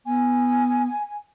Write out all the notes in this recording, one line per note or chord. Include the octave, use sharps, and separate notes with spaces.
B3 G#5